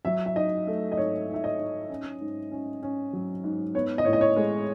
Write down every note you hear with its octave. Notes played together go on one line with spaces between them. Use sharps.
F#3 E5
E5
D#4 D#5
A3
D#5
G#2 C#5
D#4
E5
D#5
D#4
C#4
G#2
C#4
C#4
F#3
G#2
B3 C#5
D#5
A2 C#5
D#5
C#5
G#3